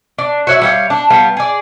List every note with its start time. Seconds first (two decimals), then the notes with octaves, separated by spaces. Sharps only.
0.18 D4
0.47 F#4 C#5 E5
0.61 G3 C#5 F5
0.90 D4
1.10 G3 B3 F5
1.37 G#4 D5